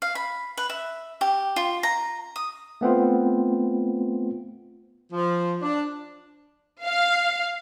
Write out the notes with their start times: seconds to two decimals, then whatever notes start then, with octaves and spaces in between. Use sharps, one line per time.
0.02 F5
0.15 B5
0.57 B4
0.69 E5
1.21 G4
1.56 F4
1.83 A#5
2.36 D#6
2.81 A3 B3 C4 F4
5.12 F3
5.62 D4
6.84 F5